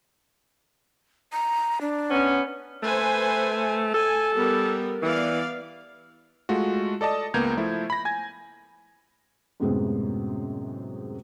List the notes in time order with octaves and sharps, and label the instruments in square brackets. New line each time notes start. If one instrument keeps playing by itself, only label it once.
[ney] A#5
D4
[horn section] B3 C#4
[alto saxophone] A3 [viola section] B4 C5 G#5
[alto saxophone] A4 [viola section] G#5
[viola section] G3 B3 A#4
[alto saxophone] E3 [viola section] B3 D5 F5
[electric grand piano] G#3 A3 F4 F#4
A4 D5 D#5 A5 D#6
C#2 A#3 B3 A#5 G6 G#6
F3 A3 E4
B5 A#6
G#5 G#6
[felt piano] F#2 A2 C3 G#3 B3 C4